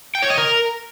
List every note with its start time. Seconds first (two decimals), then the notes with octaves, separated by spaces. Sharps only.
0.15 G5
0.22 C#5
0.30 D#5
0.38 A#4